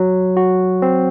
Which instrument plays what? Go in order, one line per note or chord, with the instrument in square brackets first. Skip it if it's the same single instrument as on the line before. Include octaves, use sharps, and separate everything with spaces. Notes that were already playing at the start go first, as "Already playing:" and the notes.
Already playing: [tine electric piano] F#3
F#4
C4